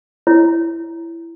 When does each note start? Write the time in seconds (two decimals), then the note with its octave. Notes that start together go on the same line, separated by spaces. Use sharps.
0.27 E4 C#5